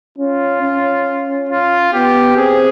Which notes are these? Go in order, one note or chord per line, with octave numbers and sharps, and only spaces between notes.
C#4 F4
C#4
F4
B3 G4
C4 G#4